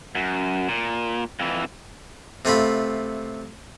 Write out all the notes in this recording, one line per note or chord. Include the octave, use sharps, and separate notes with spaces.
F#2
A#2
F2 E3
C3 A3 F4 B5